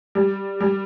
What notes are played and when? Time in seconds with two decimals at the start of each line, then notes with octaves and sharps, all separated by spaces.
0.15 G3
0.61 G3